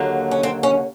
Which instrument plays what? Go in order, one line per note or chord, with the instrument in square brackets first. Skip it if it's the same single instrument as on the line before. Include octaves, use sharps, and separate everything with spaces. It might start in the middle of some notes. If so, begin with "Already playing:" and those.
Already playing: [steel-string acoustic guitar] D#2 D3 F#3 A#3
C#4
C4
C#4